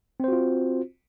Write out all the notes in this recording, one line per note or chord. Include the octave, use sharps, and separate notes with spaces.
C4 F4 F#4 C5